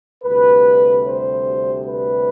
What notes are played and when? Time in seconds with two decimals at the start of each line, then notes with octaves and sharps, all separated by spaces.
0.24 D2 C3 G3 B4
1.06 C5
1.87 B4